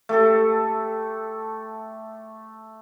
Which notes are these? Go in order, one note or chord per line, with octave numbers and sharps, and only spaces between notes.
A3 G4 A4